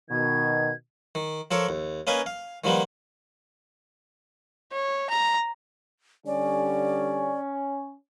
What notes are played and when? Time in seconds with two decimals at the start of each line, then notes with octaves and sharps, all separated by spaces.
0.10 B2 D#3 G#6
1.15 D#3
1.51 F3 A4 A#4 C#5
1.69 D#2
2.07 A#3 C#4 B4 D#5 F5 G#5
2.26 F5
2.64 D#3 F3 G3 A#3 B3
4.72 C#5
5.10 A#5
6.26 D3 G3 C#4 D5